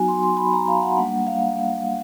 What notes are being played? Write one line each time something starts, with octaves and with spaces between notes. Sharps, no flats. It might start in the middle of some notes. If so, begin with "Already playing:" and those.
Already playing: F#3 B3 D#4 F#4 G#5
C6
C6
B5
A#5
F5
F#5
G3 A#3 D4 F#5
F5